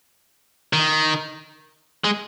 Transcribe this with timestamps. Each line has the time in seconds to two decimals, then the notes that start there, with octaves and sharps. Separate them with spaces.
0.73 D#3
2.04 G#3